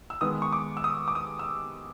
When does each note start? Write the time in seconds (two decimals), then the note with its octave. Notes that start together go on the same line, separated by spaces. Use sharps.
0.10 E6
0.21 D#3 G#3 B3 D#6
0.42 C#6
0.52 D6
0.77 E6
0.84 D#6
1.08 D6
1.15 D#6
1.39 E6